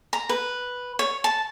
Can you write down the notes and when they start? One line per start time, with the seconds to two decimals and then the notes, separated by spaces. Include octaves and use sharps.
0.13 A#5
0.29 B4
0.99 C#5
1.24 A5